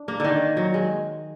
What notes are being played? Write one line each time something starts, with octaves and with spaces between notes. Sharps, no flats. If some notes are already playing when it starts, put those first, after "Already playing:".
Already playing: D4
A#3
D3 D#3
F#3
G#3